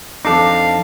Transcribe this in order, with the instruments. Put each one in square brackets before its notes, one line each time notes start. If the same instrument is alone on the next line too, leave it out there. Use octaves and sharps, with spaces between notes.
[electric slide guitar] F2 D4 D#4 [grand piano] A4 D6 [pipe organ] F5